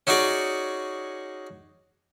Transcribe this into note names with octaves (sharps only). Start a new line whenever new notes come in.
C#4 D#4 F#4 G#4 D5